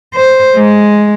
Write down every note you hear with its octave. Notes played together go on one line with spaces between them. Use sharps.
C5
G#3